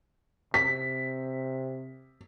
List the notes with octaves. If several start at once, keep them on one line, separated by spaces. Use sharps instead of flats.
C3 B6